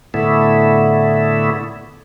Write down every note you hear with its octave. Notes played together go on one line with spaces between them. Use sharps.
A2 D3 A3 B3 E4